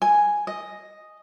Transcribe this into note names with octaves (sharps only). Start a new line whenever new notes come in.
G#5
D#5